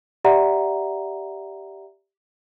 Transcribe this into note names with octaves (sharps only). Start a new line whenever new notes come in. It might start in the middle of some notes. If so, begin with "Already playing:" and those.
G4 D5 E5 F#5 A#5